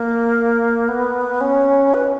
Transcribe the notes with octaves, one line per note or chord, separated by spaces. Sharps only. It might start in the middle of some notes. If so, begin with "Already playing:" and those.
Already playing: A#3
B3
C#4
B4